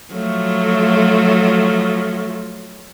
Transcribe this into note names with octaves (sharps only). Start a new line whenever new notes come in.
F3 F#3 A3